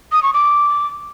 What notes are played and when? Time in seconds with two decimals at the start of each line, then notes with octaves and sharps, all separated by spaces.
0.12 D#6
0.23 C#6
0.34 D6